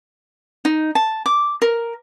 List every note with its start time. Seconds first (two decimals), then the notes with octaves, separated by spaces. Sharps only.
0.65 D#4
0.95 A5
1.26 D6
1.62 A#4